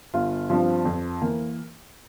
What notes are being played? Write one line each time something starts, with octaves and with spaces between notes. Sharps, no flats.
G1 F4
G2 F3 C4 F4
F2
E3 A#3